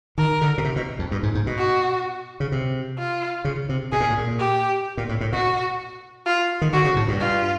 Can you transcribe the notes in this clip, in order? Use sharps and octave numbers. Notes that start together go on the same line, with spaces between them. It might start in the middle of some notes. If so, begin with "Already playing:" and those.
D#3 A#4
D3
B2
C3
B2
F2
G2
G#2
G#2
B2
F#4
C#3
C3
F4
C#3
C3
B2 G#4
A#2
A2
A#2
G4
A#2
A2
A2
B2 F#4
F4
D#3
D3 F#4
C#3
A2
G2
F4